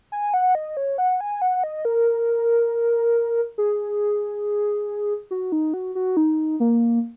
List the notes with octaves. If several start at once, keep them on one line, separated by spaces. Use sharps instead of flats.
G#5
F#5
D#5
C#5
F#5
G#5
F#5
D#5
A#4
G#4
F#4
D#4
F#4
F#4
D#4
A#3